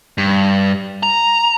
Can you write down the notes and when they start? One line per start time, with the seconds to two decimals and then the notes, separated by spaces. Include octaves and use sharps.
0.18 G2
1.03 A#5